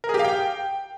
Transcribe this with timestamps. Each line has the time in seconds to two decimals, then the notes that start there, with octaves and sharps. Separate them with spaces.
0.04 A#4
0.09 G#4
0.14 G4
0.19 F5
0.25 G5